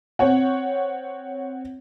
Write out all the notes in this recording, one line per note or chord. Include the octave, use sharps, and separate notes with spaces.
C4 C#5 F#5